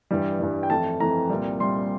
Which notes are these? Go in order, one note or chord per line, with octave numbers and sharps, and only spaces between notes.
G2 E3 G3
G2 E3 G3
G5
F2 E3 A3 A5
F2 E3 A3 A#5
C2 A#2 G3
C2 A#2 G3 C6